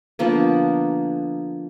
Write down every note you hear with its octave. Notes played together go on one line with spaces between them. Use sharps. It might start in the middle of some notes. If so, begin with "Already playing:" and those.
D3 F3 A#3 B3